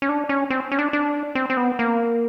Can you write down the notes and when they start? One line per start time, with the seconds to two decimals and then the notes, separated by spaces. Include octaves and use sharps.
0.02 C#4
0.09 D4
0.29 C#4
0.50 C4
0.72 C#4
0.79 D4
0.93 D4
1.35 C4
1.50 C4
1.57 B3
1.79 A#3